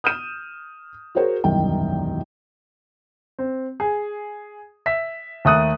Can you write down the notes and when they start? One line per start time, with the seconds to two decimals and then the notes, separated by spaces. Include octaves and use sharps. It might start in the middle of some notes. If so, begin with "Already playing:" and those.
0.04 D#6 F6 G6 D#7 E7
1.15 F#4 G#4 A#4 C5 C#5
1.44 E1 C2 F#2 D#3 G5
3.39 C4
3.80 G#4
4.86 E5 B6
5.45 D#2 A3 A4 D#6 F#6 D#7